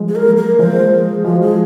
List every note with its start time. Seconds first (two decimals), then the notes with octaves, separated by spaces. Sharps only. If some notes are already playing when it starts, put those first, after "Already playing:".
Already playing: F3 G#3
0.08 G#4
0.15 A#4
0.26 F#3 A#3
0.37 A#4
0.59 F3 G#3 C5
0.92 G#4
1.25 F3 G#3 F#4
1.42 G#4